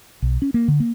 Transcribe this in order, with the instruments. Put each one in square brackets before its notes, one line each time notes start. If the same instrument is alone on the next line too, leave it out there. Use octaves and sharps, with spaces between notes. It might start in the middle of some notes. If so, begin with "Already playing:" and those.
[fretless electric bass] B1
C#4
A#3
D3
A#3